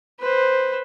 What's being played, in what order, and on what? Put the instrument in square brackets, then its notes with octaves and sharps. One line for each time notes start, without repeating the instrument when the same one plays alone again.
[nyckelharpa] B4 C5